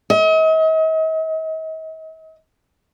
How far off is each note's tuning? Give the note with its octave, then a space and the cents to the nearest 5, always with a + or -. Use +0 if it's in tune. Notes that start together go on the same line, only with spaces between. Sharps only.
D#5 +40